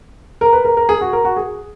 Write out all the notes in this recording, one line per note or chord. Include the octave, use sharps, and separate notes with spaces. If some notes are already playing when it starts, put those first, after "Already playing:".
A#4
B4
A#4
A#4
G#4
F#4
A#4
F#4
G#4